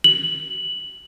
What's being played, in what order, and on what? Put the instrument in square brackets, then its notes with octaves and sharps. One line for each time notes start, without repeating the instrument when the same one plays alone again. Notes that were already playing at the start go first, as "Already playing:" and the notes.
[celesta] F#7